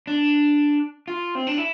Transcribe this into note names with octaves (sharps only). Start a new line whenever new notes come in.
D4
F4
C4
D4
E4